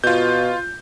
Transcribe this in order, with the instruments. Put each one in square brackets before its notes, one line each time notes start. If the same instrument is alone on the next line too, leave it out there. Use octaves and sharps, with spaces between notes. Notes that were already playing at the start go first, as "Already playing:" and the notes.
[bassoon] B2 [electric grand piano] F4 G6